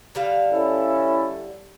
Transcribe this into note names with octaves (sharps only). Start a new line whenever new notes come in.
D3 G3 F5
C#4 E4 A4